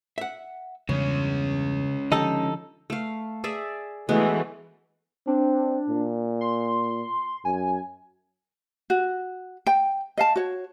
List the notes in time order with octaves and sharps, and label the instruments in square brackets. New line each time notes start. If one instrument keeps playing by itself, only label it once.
[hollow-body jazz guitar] E5 F#5
[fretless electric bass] E2 G2 [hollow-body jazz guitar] C#3 [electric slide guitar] G#3 C#4
[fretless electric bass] D3 F3 [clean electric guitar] D#4 A4 [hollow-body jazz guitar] G4 D#5
[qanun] A3 F5
G#4 D5 E5
[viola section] E3 A3 [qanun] G#3 B3 F#4
[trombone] C4 [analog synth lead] D4
[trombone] A#2
[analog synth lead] C6
[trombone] F#2 [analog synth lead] G#5
[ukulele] F#4
G5
D#5 F5 A5
F#4 C#5